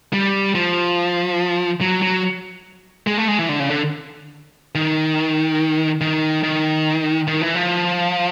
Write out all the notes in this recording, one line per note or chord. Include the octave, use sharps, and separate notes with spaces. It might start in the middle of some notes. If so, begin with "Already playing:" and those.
G3
F3
F#3
F#3
G#3
A3
G#3
E3
D3
C#3
D3
D#3
D#3
D#3
D#3
E3
F3